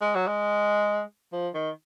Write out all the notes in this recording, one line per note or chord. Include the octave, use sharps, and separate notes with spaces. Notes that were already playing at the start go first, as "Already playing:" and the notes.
G#3
F#3
G#3
F3
D#3